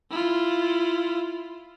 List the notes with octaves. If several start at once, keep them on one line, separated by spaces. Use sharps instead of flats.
E4 F4